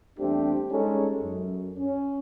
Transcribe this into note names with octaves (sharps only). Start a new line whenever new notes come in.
E2 G3 A3 C4 D4 G4
G3 G#3 C#4 D#4 G#4 A4
F#2
C#4